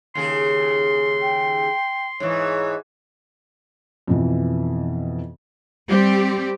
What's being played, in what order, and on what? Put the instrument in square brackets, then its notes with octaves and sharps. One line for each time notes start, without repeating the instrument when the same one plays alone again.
[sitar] D#2 C#3 G#4 [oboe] C6
[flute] G5
[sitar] G#2 E3 [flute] C#5
[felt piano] F2 B2 E3
[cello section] G3 C4 G4